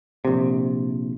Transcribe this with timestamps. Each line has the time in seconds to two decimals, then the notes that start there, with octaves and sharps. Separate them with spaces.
0.25 A#1 C3